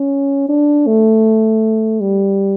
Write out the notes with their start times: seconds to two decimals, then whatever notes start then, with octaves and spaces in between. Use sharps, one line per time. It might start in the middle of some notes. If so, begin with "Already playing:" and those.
Already playing: C#4
0.49 D4
0.87 A3
2.00 G3